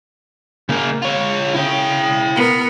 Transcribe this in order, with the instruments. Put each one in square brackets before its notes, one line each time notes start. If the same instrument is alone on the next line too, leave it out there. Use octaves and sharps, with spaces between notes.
[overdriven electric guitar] C#3 A#3
F4 C#5
[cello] C#3 [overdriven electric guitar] E4 G5
[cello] B3 A#4